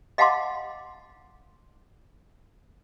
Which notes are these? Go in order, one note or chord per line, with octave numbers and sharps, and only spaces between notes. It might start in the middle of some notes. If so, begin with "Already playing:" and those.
D#5 F5 F#5 A5 C6 D6